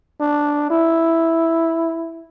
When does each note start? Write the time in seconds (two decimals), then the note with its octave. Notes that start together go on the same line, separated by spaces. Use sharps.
0.20 D4
0.70 E4